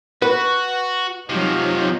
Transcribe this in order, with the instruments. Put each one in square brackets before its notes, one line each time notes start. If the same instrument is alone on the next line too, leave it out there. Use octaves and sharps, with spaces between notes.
[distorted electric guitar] F#4 [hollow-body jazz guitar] B4
[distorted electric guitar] C3 F3 [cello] F#3 D#4